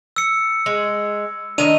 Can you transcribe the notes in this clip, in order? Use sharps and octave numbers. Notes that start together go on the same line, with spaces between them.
E6 C#7
G#3
A2 D#3 D4 D#5 D#7 F7